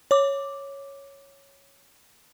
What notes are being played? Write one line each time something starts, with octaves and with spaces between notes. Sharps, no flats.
C#5 D6